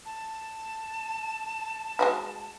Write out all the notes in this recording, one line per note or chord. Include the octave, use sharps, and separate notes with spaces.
A5
G#3 F#4 B4